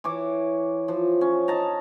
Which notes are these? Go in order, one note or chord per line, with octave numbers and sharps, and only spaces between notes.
E3 C#5 D6
F3
C#4
D#4 A5 A#5